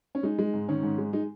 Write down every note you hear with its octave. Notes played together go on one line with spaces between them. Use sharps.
C#4
G#3 D#4
G#3
G#2
D#3 C#4
G#2
G#3
G#3 D#4